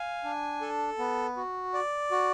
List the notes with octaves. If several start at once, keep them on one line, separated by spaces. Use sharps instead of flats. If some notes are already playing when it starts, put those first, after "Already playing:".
Already playing: F5 G#5
D4
A4
B3
F#4
D5
F#4